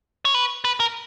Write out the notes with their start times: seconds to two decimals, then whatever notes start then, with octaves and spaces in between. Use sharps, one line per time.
0.25 C#5
0.34 B4
0.65 B4
0.80 A#4